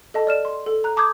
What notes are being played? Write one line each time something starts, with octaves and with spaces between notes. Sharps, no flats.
A4 D#5 A5
D5 F6 E7
C6
A4
A#5 F#6
A5 D6 D#6 G6 G#6